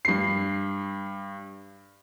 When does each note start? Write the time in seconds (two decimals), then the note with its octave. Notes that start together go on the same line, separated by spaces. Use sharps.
0.05 G2 C7